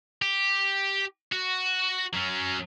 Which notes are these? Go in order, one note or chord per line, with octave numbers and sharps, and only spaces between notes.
G4
F#4
F#3 C#4